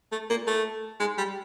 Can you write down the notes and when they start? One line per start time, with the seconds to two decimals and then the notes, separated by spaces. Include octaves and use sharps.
0.12 A3
0.30 A#3
0.47 A3
1.00 G#3
1.18 G3